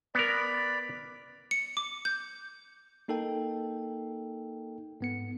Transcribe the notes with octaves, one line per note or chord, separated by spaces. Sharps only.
B3 A#4 D5 B5
C#7
D6
G6
A#3 D#4 A4 A#4 G5
G#2 B3 C#7